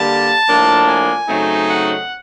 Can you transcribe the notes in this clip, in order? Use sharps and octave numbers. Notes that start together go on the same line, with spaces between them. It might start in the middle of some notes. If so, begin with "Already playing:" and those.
Already playing: D3 G3 A#3 A5
A2 F3 A#3 D4
G#5
C#3 F#3 A3 C4 D#4
F#5